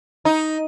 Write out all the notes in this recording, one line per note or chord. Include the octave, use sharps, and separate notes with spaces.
D#4